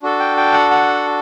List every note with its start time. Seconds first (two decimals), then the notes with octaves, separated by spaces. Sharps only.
0.03 D4 F#4 A4
0.20 G5
0.37 G5
0.53 F#5
0.71 F#5